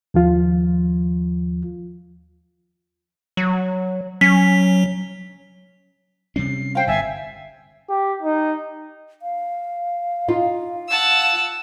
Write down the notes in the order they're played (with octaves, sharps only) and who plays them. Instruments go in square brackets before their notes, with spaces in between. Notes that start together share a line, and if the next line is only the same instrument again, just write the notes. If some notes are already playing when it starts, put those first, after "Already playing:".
[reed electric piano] D#2 F3 F4
[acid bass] F#3
[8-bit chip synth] F#3 [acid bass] C#4 [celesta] B6
[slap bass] C3 G3 C#4 [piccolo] C7
[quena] C5 [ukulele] F5 G5
[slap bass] G1 G2 [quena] E5 [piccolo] G#5
[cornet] G4
D#4
[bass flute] F5
[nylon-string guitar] D#4 F4
[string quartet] F#5 A5 E6